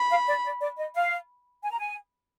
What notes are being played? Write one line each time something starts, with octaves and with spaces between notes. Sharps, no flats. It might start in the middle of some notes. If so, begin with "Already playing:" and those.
Already playing: B5
F5
D5
D5
D5
D#5
F5
G#5
A#5
G#5